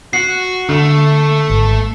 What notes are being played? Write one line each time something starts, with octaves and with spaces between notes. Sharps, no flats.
F#4 C7
D3 A3
G#1